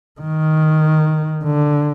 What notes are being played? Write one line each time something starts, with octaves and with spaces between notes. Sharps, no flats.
D#3
D3